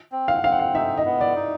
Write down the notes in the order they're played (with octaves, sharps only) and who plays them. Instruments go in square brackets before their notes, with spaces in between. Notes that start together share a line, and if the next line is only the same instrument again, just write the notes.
[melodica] C4
[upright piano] F5
F#5
[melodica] C4 [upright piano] F5
[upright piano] F#5
F5
[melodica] D#4 [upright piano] E5
[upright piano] D#5
[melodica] B3
[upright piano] D5
[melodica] D#4